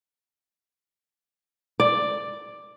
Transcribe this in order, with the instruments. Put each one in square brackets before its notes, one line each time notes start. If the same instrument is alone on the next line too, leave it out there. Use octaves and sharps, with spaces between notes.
[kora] D5